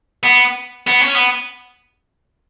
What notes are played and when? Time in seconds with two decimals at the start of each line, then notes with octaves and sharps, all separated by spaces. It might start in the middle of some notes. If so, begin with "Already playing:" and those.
0.23 B3
0.87 B3
1.01 C#4
1.15 B3